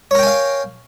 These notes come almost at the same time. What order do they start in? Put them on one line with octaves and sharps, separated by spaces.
C#5 A#4 G5 G#5 F5